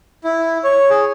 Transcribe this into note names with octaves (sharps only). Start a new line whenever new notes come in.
E4
C#5
G#4